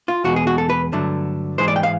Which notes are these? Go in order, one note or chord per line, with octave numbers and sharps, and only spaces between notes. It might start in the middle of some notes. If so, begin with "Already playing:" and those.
F4
E2 B2 G#3 F#4
G#4
F#4
A4
B4
G2 D3 F#3 A3
G#2 E3 G#3 C5
D5
G5
F5